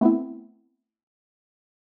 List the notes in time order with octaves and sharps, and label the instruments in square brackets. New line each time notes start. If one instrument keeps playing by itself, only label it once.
[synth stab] A3 B3 C4 E4